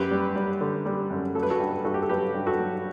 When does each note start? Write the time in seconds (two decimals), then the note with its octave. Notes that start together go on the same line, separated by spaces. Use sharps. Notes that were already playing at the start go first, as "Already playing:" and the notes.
Already playing: F#2 G4 B4
0.11 G3
0.36 G3
0.61 D3
0.86 G3
1.10 F#2
1.35 F#3 A4
1.43 B4
1.50 F#4 A4
1.60 G2
1.85 G2 F#4 A4
1.94 G4
2.02 A4
2.09 F#3 G4 B4
2.34 G2
2.47 F#4 A4
2.60 F#3